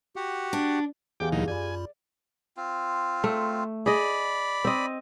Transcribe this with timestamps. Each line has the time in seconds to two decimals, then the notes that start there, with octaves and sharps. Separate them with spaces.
0.16 F#4 G4 F#5
0.53 D4
1.20 E2 G4 G#4 F5 G5 D6
1.32 D2 A#2 F3 F#3 D#4 E4
1.48 F#2 F4 D5 G#5 B5
2.57 C4 F4
3.24 A3
3.86 G#4 D5 D#5 B5
4.65 C4 D#5